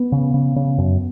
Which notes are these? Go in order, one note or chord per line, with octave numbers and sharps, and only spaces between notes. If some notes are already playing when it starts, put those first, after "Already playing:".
Already playing: B3
C#3
C#3
C#3
F#2